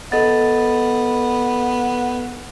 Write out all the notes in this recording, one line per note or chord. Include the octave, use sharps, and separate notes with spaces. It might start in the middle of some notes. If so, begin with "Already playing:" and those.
B3 A4 D#5 A6